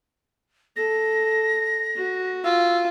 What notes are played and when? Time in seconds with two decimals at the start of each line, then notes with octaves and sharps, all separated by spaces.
0.76 A4 A#6
1.96 F#4
2.44 F4 E6